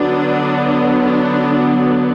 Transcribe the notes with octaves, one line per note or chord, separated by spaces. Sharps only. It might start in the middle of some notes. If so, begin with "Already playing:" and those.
Already playing: D3 F#3 B3 D4
D4
D4